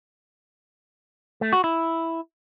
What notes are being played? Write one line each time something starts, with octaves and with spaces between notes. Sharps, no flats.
A3
F#4
E4